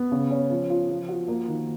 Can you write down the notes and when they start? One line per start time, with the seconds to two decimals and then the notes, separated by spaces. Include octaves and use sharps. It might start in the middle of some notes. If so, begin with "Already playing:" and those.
Already playing: B3
0.12 C#3
0.31 C#4
0.50 F3
0.70 F4
0.89 F3
1.08 F#4
1.28 A#3
1.48 D#3